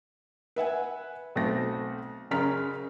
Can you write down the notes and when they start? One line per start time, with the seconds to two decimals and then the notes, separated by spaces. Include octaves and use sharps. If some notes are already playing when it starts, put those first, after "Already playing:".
0.56 B4 E5 F#5 G#5
1.35 B1 A3 C4 A#6
2.31 F#1 C#3 C#4 A#5 F6 B6